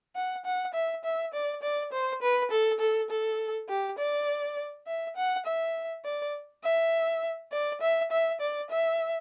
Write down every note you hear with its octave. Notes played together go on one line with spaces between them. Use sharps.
F#5
F#5
E5
E5
D5
D5
C5
B4
A4
A4
A4
G4
D5
E5
F#5
E5
D5
E5
D5
E5
E5
D5
E5